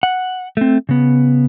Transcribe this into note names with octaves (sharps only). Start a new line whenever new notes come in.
F#5
A3 C4
C#3 B3